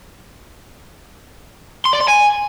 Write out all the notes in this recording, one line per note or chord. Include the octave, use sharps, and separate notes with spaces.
C6
D5
C6
G#5